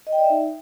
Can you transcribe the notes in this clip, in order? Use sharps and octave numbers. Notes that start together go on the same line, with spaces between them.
D#5
G5
D5
E5
D#4